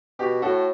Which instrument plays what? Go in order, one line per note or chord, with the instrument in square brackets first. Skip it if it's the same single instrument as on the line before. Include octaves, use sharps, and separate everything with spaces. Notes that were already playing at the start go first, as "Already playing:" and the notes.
[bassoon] B2 [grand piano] G4
[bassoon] A2 [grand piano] F#4 A4